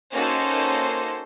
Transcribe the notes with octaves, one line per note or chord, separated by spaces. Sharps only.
A#3 C#4 D#4 F#4 A4 C5